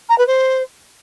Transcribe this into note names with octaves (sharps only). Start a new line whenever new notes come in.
A#5
B4
C5